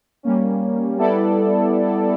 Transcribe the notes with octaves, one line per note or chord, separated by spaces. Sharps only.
G3 A#3 C#4
G3 B3 E4 A4 D5